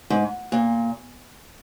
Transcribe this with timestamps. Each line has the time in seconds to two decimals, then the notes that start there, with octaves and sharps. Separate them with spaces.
0.10 G#2
0.52 A#2